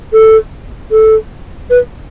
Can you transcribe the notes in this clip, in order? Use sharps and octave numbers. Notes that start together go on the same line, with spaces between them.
A4
A4
B4